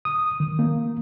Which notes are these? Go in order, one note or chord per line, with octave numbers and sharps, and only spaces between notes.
D#6
D#3
A#3